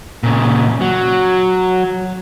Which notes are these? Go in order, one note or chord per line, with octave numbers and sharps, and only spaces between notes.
A#2 C#3
F#3